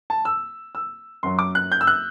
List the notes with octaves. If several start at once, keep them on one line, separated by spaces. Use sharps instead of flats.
A5
E6
E6
F#2 F#3 C6
D6
F#6
G6
E6
F#6